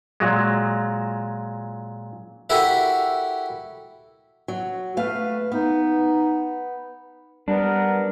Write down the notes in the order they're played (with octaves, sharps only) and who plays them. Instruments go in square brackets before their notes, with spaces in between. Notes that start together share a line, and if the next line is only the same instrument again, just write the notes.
[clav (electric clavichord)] A#2 F#3 G#3
[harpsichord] E4 F#4 G4 A4 A#4 E5
[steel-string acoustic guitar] F#3
[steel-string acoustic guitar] A3 F5 [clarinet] B4
[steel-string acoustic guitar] B3 [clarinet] D#4
[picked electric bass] G3 [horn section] B3 A#4 [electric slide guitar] D4